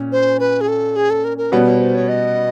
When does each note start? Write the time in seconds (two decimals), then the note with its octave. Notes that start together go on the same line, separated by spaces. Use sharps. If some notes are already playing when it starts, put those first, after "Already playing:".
Already playing: A#2 C#4
0.12 C5
0.40 B4
0.61 G#4
0.68 A4
0.96 G#4
1.10 A4
1.24 A#4
1.38 A#4
1.52 B2 G3 B3 C#5
1.66 C#5
1.80 C5
1.95 C#5
2.08 D#5